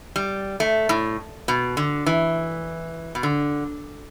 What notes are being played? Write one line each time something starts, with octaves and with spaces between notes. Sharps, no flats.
G3
A3
A2
B2
D3
E3
B2
D3